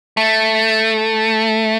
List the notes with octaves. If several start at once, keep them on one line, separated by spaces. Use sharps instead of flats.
A3